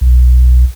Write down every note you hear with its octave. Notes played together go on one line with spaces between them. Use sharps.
B1